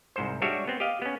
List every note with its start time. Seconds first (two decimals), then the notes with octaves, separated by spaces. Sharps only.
0.16 C2 G#2 C5
0.42 G3 G#3 D4 F#4 C#5 E5
0.67 B3 C4
0.80 G4 D#5 F5
1.02 B3 C#4